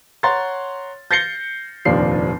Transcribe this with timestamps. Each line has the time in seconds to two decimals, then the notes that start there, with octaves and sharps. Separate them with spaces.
0.23 C#5 F#5 A#5 C6 A6
1.11 G6 A6 A#6 C7 C#7 G7
1.85 F1 D#2 A#2 F3 D4 C7